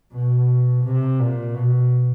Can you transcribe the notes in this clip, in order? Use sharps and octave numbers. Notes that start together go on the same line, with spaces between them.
B2
C3
A#2
B2